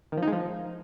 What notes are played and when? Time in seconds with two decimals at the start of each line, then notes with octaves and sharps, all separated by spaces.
0.12 D#3
0.17 F3
0.22 D#4
0.27 G#3
0.32 F3